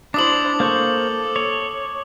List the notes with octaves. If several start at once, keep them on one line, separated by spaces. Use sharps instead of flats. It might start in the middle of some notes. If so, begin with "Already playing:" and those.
D4 E4 C5 D6 D#6 F#7
A#3 A4 C5 C#6
C#5